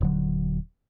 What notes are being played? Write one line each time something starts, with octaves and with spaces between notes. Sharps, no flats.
D#1 D3 F#3